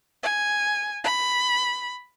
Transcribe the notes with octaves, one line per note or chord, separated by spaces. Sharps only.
G#5
B5